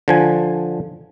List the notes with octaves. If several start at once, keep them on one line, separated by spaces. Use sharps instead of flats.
D3 F3 G#5